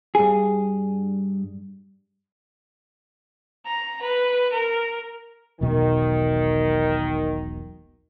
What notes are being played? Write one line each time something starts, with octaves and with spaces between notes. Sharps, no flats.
G2 G#4
A#5
B4
A#4
E1 B1 B2 D#3